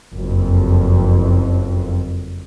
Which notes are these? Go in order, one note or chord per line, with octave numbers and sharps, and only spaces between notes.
F#1 F2